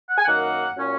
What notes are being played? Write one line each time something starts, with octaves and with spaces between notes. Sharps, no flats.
F#5
G#5
F#2 D#3 A#3 F#5
A#2 F#3 C#4